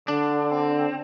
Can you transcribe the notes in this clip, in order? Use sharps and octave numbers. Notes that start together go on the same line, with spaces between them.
D3 D4
C4